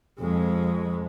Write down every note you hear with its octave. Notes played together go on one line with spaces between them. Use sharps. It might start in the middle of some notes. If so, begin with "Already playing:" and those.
F2 G#3